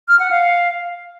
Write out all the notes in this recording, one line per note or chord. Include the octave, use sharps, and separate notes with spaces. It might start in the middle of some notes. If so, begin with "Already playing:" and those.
F6
F#5
F5